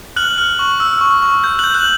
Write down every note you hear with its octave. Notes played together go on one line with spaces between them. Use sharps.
F6 F#6 F#7
F6
C#6
E6
C#6
C#6
G6
F#6 G6 F#7
F#6 F#7